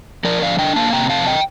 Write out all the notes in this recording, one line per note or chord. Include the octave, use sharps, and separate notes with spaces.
F3 A#4 D5
D3 D5 F5
D4 D#5 G5
A#3 F5 A5
C3 G5 A#5
F2 F5 A5
D#5 G5